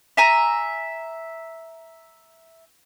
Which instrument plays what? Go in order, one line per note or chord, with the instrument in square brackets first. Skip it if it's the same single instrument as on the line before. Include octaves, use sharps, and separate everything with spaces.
[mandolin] E5 G#5 A#5